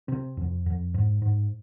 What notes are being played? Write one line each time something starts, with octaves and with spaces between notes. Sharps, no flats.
C3 C4
F2
F2
G#2
G#2